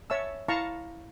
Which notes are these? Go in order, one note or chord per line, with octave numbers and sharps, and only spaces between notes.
C#5 E5 A5 E6
E4 F5 A5 A#5 C#6